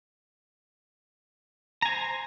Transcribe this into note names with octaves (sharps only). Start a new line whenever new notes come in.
C5 G#5 A#5